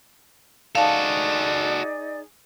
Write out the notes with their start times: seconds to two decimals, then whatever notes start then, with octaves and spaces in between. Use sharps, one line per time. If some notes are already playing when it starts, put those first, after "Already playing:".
0.75 D#4 F#4 G#4 A4 D5 F5 A5